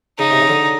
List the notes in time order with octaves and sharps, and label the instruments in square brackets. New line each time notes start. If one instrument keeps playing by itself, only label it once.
[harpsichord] C#3 [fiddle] D#4
[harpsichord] C3
C#3
D3